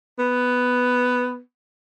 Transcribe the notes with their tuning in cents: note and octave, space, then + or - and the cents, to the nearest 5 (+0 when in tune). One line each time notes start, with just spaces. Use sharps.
B3 +5